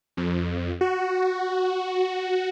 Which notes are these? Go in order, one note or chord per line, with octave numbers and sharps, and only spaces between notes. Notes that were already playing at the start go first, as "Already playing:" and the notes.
F2
F#4